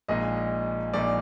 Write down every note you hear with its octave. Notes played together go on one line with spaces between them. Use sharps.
A#1 A#2 G#3 D#4 D#5
A#1 A#2 G#3 D#4 D5